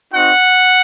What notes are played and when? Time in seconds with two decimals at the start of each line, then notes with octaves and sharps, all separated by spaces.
0.13 C4 D#4 F#4 F#5